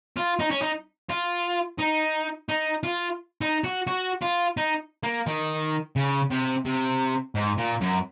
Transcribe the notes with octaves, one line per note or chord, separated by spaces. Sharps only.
F4
D#4
C#4
D#4
F4
D#4
D#4
F4
D#4
F#4
F#4
F4
D#4
A#3
D#3
C#3
C3
C3
G#2
A#2
F#2